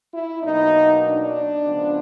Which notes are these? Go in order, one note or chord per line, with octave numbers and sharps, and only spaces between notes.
E4
B2 F#3 A#3 D#4
D4
C#3 F3 G#3 B3